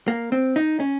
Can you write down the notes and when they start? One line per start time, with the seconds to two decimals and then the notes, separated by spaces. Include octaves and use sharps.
0.08 A#3
0.32 C4
0.56 D#4
0.80 C#4